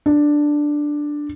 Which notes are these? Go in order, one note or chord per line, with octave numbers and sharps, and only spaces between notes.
D4